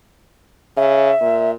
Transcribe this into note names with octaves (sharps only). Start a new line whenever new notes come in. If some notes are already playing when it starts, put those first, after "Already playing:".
C#3 E5
A#2